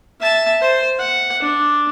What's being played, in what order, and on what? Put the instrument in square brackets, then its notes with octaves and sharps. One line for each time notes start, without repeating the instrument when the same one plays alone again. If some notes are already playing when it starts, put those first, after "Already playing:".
[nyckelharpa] E5 A5
C5
F#5
D4